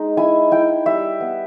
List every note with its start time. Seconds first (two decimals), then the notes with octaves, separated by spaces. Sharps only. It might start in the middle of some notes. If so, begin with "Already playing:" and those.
Already playing: G#3 D#4
0.17 E4 G#5
0.52 E4 G5
0.86 G3 E5
1.21 B3